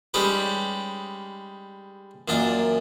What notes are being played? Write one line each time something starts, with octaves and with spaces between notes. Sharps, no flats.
G3 G#3 C#4 D#4 G4 B4
F#2 A#2 D4 D#5 G#5